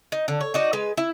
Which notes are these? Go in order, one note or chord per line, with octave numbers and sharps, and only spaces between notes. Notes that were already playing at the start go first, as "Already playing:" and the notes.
D#4
D3
C#5
D#4 F#4 D5
G#3 B4
E4